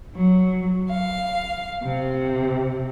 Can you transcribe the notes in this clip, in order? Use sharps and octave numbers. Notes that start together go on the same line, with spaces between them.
F#3
F5
C3